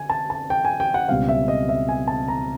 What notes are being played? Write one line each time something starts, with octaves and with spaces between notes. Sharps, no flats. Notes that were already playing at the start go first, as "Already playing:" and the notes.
Already playing: D3 G#5
A5
A5
G5
G#5
G5
F#5
C#2 B2 G3 C4 F5
E5
D#5
E5
G#5
A5
A#5